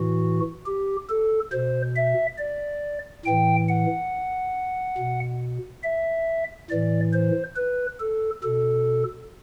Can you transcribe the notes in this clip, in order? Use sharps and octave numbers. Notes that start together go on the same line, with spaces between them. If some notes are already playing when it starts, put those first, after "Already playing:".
Already playing: A2 E3 F#4
G4
A4
B2 C5
E5
D5
A2 E3 G5
F#5
B2
E5
A2 E3 D5
C5
B4
A4
B2 A4